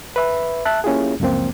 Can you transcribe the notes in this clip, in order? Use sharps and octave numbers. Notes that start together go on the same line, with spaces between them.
B4 E5 B5
E5 A5 F#6
A#3 C#4 E4 F4 G4 G#4
C#2 F#2 F3 A#3 C4